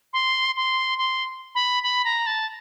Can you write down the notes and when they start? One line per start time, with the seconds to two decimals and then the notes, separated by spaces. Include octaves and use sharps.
0.13 C6
0.57 C6
0.98 C6
1.55 B5
1.83 B5
2.05 A#5
2.27 A5